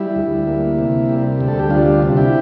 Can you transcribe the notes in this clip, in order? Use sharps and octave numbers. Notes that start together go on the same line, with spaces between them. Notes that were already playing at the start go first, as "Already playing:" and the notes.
Already playing: G3 E4
D2
A#3
C3
G3
D2
A4
G4
G3 D4 F4
C3
E4 G4